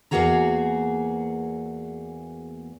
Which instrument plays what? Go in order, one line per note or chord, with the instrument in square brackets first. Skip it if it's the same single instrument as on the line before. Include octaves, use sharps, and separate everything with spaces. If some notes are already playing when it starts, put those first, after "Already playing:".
[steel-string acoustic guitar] E2 A#2 A#3 F#4 G#4 A#5